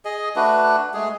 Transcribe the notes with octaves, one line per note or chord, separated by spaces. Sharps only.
G#4 D#5
A3 D4 F#4 B4
G#3 A3 G#4